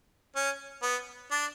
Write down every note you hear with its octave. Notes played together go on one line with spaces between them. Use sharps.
C#4
B3
D4